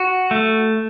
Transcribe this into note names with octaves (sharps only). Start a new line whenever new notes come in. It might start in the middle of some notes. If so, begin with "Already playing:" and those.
Already playing: F#4
A3